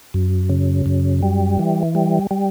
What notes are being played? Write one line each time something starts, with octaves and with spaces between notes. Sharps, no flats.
F#2
C#3
F#2
G3
E3
G3
G3